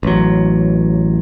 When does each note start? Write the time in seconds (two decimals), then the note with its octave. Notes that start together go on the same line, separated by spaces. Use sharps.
0.03 A1 F#3